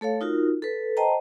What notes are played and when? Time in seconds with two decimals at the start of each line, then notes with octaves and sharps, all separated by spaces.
0.01 A3 A4 C#5 F5
0.21 D#4 F4 F#4 A#4
0.62 A4 B4
0.97 C5 D#5 G5 A5 A#5